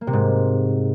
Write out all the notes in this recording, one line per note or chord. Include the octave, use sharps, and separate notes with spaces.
A#3
C3
G#2